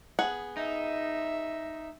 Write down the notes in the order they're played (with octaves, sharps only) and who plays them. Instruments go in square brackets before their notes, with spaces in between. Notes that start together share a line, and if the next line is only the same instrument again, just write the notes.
[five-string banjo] B3 G#4 F#5
[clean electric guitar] D#4 [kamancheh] E5